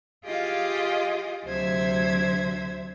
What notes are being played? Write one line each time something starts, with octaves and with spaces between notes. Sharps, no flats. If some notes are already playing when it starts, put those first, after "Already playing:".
F4 G4 G#4 D#5 F5
D2 C3 F#3 C5 E5 G#6